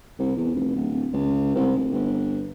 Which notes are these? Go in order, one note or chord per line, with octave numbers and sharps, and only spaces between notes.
C2
E2
F1
D1
C#2
C2
F1
G1